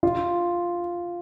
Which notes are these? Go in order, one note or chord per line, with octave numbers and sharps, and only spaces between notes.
F4